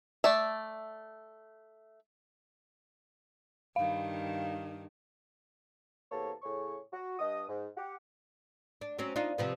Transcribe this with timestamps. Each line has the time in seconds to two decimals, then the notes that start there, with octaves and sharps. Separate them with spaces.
0.24 A3 D5 E5
3.76 G2 D#3 F5
6.11 E2 C3 A#3 A4 C#5 A5
6.42 A2 C#3 G#4 C#5 C#6
6.92 F#4
7.19 G2 D#5 D#6
7.48 G#2
7.77 G4 F#5
8.81 D4
8.99 F#3 C4 C#4
9.16 D4 D#4 F4
9.38 C3 F3 B3